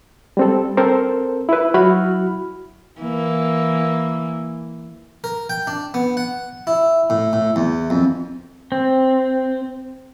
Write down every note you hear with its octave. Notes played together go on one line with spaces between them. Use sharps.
G3 C4 A4
C4 A4 A#4 C5
E4 B4
F#3 E4 F#4 B5 F6
E3 A#3
A#4
G5
D4
B3
F#5
E4
A2
A2
E2
F2
C4